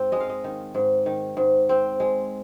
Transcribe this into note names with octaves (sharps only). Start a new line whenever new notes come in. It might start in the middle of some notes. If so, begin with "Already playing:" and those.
Already playing: G#2 C4
G#3 D#5
F5
D#5
D#3
G#2
D#3
G#2
C4
G#3